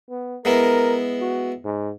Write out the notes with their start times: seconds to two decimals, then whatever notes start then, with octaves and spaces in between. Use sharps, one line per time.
0.10 B3
0.45 G#3 B3 E4 A#4
1.21 F#4
1.65 G#2